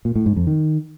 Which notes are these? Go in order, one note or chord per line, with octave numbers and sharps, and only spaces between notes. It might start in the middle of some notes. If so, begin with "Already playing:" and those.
A#2
A2
G#2
F2
D#3